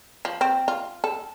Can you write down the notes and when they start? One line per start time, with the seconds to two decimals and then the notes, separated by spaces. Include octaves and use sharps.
0.25 F3
0.41 C4
0.68 F4
1.04 A4